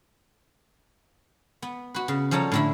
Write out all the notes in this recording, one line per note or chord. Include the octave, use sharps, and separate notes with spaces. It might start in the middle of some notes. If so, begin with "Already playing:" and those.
B3
F#4 B4
C#3
F3 G3 A4 C#5 A#5
A2 D3 E4